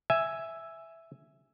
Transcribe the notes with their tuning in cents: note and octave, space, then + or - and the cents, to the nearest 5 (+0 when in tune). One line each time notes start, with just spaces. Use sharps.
E5 +0 G#5 +0